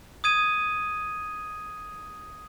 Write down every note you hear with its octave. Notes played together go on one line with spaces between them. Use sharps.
D#6 G#6 D#7